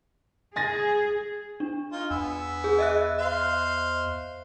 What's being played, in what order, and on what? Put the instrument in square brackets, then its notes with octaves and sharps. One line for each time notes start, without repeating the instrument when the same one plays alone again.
[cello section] G#4 [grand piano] G#5 A6 A#6
[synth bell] D4
[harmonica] D#4 F4
[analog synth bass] E2 [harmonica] B3 G#5 E6
[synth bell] G#4
D#5 E5 F#6
[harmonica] C5 F5